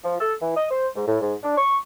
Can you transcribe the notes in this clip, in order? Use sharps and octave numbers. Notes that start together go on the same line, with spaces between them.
F3
A4
E3
D#5
C5
G#2
A2
G#2
D4
C#6